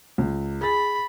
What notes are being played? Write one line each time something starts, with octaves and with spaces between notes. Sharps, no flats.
C#2
G#4 B5 A6